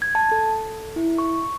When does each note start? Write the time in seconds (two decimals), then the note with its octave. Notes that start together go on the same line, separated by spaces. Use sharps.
0.02 G#6
0.15 A5
0.32 A4
0.96 E4
1.18 C#6